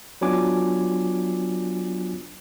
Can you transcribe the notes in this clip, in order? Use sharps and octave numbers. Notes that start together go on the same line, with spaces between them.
F#3 B3 D4 F4 G#5 D6